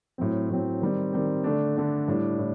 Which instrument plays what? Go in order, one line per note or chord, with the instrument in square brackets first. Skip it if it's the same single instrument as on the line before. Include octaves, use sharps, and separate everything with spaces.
[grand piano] A2 F#3 C4
A2 F#3 C4
D#3 G3 C4
D#3 G3 C4
D3 A3 D4
D3 A3 D4
A2 G3 D4
A2